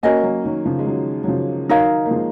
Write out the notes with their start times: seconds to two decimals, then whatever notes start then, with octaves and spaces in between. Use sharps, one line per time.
0.03 A#3 C#4 F#4 A#4 D#5 G#5
0.23 F#3 A#3
0.44 D#3 F#3
0.65 C#3 F3
0.79 G#3
0.86 D#3 F#3
1.23 F#3
1.28 C#3 F3
1.69 D#3 F#3 D#4 A#4 C#5 F5
2.06 A#3
2.11 F3 G#3